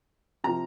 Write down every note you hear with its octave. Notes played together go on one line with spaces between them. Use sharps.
C3 F3 A#5